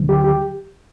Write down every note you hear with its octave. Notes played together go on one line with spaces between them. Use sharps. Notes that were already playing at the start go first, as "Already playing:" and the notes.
Already playing: D2 D3 F#3
G4
G4